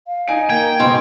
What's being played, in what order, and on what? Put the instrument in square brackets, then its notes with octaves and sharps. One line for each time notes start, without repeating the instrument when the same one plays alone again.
[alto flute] F5
[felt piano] D#4 G#5 D7
[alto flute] A#3 [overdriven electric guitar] G5 [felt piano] G#6
[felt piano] F#1 [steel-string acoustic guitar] G#2 B2 G#5 [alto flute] C6